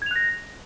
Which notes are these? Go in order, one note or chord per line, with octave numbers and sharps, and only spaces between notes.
F#6 G#6 A#6 F7